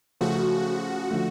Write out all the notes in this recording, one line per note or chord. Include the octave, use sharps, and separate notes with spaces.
C#3 F3 A3 C#4 F#4
D3 F3 A3